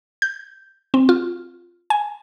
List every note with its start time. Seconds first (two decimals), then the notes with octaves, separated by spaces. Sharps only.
0.22 G6
0.94 C4
1.09 F4
1.90 G#5